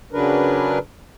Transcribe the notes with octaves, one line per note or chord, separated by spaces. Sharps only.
C#3 F#3 D4 A#4 B4